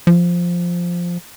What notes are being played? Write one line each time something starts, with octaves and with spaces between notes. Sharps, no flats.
F3